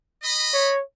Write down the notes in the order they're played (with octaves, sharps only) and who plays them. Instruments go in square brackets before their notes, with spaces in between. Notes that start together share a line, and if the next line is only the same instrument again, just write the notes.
[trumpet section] D#5 B5
[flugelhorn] C#5